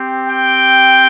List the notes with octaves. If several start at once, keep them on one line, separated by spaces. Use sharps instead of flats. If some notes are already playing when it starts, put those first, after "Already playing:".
Already playing: C4 G4
G5